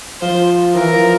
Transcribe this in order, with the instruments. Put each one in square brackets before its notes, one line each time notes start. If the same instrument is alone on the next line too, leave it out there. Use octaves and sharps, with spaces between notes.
[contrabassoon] F3 [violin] C5
[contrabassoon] E3 [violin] A#4
[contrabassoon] F3